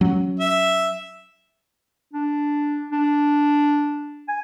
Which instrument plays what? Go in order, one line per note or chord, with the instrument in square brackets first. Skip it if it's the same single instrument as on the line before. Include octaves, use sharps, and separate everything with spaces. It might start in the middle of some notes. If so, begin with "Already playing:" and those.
[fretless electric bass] F#3 C#4
[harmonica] E5
[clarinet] D4
D4
G#5